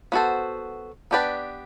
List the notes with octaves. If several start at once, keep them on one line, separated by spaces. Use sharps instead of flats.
B3 F#4 A4 C5
B3 D4 G4 B4 D5